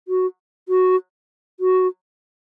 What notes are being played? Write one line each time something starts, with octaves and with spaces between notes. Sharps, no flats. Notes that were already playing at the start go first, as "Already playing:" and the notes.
F#4
F#4
F#4